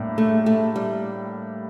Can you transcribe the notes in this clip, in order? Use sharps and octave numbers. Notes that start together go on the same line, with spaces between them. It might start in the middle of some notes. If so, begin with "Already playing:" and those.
Already playing: A2 G3 A#3 D4
A3
A3
G3